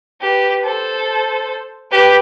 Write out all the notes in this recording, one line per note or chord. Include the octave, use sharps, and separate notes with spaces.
G4 B4
A4 C5
G4 B4